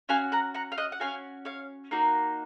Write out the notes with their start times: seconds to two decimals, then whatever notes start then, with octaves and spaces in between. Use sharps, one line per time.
0.09 C#4 F#4 F5 G#5
0.32 F#5 A#5
0.54 F#5 A#5
0.72 F5
0.78 D#5 F#5
0.92 F#5
1.00 C#4 F#4 F5 G#5
1.45 C#5 F5
1.91 A#3 D#4 F#4